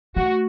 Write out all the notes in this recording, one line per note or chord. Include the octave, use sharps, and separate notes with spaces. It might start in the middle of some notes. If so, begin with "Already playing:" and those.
A3 F#4